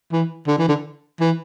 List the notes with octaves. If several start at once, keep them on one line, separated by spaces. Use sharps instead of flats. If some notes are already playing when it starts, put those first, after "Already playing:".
E3
D3
E3
D3
E3